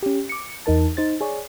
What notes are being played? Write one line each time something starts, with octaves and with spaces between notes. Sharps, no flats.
C#4 G4
D6 C#7
E2 D#4 A#4 A5
D#4 C5 A6
G#4 C#5 D5